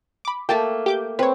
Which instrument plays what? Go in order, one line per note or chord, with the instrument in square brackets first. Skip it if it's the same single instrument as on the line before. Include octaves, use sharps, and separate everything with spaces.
[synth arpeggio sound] B5 D6
[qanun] A3 A#3 [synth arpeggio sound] G5 A5
[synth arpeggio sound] G4 D6 G6
[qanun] C4 [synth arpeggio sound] B4 C#5